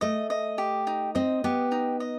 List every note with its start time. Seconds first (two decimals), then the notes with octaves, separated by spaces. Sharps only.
0.01 A3 D#5
0.30 D#5
0.58 G4
0.87 D#4
1.15 C4 D#5
1.44 B3 G4
1.72 D#4
2.00 D#5